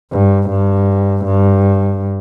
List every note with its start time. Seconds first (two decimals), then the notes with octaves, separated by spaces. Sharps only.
0.12 G2
0.50 G2
1.25 G2